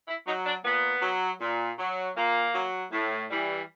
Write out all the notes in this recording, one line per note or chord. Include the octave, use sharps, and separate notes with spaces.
E4
F#3 D#4
D4
A#2 B3
F#3
A#2
F#3
A#2 A#3
F#3
A2
E3 G3